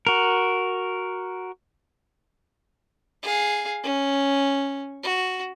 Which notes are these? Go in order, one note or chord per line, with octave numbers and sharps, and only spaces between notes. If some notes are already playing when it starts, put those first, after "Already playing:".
F#4 A#4
G#4 F5
C#4
F#4